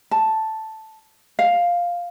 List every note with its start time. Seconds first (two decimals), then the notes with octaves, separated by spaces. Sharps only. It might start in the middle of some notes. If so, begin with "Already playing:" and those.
0.11 A5
1.39 F5